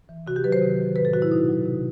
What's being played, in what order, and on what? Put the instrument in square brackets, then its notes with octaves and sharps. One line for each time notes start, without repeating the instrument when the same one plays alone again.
[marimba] E3
C3 F#4
G4
D#3 F#3 B4
C5
C3
D#3 F#3
A2 B4
A4
F#3 F#4
E4
B2 D#4
F#3
C3